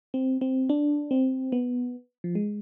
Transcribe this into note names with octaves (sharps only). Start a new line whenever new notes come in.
C4
C4
D4
C4
B3
F3
G#3